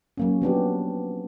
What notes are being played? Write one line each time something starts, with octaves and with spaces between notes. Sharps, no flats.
F#3 A#3 C#4
F3 B3 D4 G4